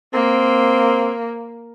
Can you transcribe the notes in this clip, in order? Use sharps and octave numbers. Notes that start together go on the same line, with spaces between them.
A#3 C4